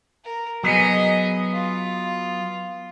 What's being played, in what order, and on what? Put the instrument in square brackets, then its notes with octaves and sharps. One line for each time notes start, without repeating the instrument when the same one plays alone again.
[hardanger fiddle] A#4
[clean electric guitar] F#3 B3 [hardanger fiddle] G#4 D#5
[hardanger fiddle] F4